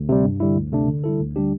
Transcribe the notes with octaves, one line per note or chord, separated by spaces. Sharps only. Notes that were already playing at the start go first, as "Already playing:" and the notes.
Already playing: D2
C3 G3
G2
D3 G3 E4
D2
C3 A3 D4
D3
G3 E4 A4
D2
D3 G3 D4 G4